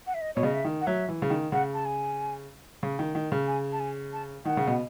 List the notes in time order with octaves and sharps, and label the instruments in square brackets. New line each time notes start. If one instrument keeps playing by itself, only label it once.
[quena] F#5
E5
D#5
[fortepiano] B2 [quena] C#5
[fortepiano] C#3 [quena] D#5
[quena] E5
[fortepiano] D#3
[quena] F#5
[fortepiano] F#3 [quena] E5
[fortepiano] E3
C#3
D#3
[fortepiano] C#3 [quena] F#5
[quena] A5
G#5
[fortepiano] C#3
D#3
D#3
C#3
[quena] G#5
A5
G#5
A5
[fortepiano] D#3 [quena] F#5
[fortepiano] C#3
B2